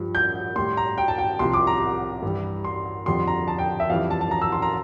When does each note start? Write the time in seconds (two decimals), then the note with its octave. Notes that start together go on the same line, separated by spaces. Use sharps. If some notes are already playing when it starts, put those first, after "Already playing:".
Already playing: G2 F3
0.15 G6
0.56 A2 G3 C6
0.77 A#5
0.98 G5
1.08 A5
1.18 G5
1.39 C2 C3 F3 C6
1.53 D6
1.67 A#5
2.22 G2 E3 G3
2.64 C6
3.06 F2 D3 G3 C6
3.28 A#5
3.48 A5
3.58 G5
3.80 E5
3.90 F2 E3 G3 F5
4.10 A5
4.21 A5
4.31 A#5
4.42 E6
4.52 C6
4.62 A#5